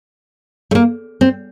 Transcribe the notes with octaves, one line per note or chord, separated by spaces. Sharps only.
A3
A#3
C4